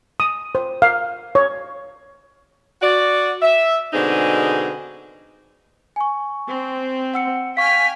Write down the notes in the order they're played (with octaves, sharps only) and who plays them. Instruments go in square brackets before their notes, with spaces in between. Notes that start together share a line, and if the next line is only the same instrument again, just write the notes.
[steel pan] D#6
C5
F5
C#5
[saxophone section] F#4 D5
E5
B2 D3 G#3 C4 D#4 G#4
[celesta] G#5 C#6
[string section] C4
[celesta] F#5 E6 C#7
[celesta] F5 C#6 [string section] G5 G#5 F6 [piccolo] B6